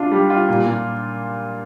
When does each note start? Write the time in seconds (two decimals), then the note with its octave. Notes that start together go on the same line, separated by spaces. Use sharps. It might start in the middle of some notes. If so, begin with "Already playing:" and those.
Already playing: D4 F4
0.11 G3
0.30 F4
0.49 A#2
0.66 A#2